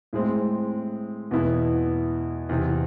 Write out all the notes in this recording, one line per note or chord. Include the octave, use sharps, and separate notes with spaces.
A2 G#3 C4
E2 B2 B3 E4
E2 C3 E3